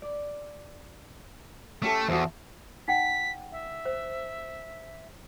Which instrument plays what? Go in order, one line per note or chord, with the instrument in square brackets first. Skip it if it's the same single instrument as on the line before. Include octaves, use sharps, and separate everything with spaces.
[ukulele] D5
[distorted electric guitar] A3 [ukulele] C#4 G4 A4
[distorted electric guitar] E2 [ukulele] F#4 A4 C5
[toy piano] D#4 F#5 G5 [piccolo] B6
[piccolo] E5
[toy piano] C5